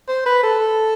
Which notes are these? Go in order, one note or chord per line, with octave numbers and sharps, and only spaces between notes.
C5
B4
A4